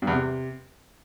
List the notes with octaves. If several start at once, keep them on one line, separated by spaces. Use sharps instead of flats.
G2
E2
C3